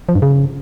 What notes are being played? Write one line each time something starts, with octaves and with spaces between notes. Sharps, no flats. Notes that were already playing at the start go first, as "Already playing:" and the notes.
F3
G2
C#3